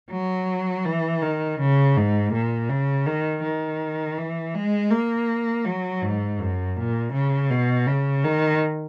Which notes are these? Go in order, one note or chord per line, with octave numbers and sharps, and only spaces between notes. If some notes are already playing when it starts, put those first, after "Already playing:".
F#3
E3
D#3
C#3
G#2
A#2
C#3
D#3
D#3
E3
G#3
A#3
F#3
G#2
F#2
A#2
C#3
B2
C#3
D#3